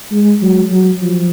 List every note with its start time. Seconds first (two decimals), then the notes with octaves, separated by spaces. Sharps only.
0.12 G#3
0.42 F#3
0.71 F#3
1.02 F3